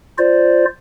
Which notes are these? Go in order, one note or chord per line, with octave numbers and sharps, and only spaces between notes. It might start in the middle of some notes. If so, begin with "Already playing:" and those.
F4 C5 D5